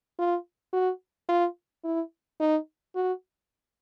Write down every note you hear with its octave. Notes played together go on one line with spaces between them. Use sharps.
F4
F#4
F4
E4
D#4
F#4